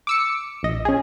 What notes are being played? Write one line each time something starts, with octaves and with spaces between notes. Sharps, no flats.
D6 E6 C#7
A#1 D#5
C#4 G#4